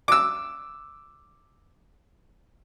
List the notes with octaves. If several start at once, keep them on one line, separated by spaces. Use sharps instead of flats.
D6 E6